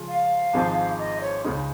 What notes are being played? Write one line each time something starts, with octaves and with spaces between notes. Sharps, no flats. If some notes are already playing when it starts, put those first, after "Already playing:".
Already playing: C#3 F3 G#3 C#4 F4
F5
G#1 G#2 F3 G#3 D#4
D#5
C#5
C#2 C#3 G#3 D#4 G#4